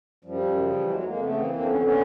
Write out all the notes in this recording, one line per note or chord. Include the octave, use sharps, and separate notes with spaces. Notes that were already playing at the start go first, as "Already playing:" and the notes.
F#2 F3 G3
F#2
C#3
E3
F2 F#3 G#3
F2 G#3 A#3
C#3 A3 B3
E3 A#3 C4
F2 A#3 C4
D4
D3 B3 C#4
D3 B3 C#4